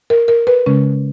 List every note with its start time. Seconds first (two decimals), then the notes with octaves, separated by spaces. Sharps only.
0.10 A#4
0.28 A#4
0.47 B4
0.66 C#3 G#3 C#4